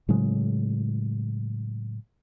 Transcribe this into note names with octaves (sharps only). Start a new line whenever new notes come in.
A2 C#3 F#3 G#3